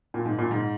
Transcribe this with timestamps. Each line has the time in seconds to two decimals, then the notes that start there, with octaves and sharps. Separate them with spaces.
0.14 A#2
0.26 G#2
0.38 A#2
0.51 G#2